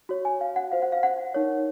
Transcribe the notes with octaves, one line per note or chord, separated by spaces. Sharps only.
F#4 C#5
G#5
F5
F#5
F4 C5 F5
F#5
F5
F#5
D#4 A#4 C#5